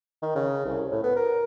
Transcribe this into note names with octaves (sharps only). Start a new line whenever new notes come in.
D#3
C#3
C2
A2
B3
A#4